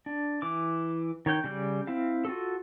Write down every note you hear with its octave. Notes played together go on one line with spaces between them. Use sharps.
D4
E3 D6
D#3 C#5 G5 G6
C#3 G3 G6
C4 E4 F5
F4 F#4 A4